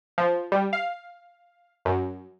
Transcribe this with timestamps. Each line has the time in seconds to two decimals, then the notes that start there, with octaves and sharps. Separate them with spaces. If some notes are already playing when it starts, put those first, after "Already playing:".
0.18 F3
0.52 G3
0.73 F5
1.85 F#2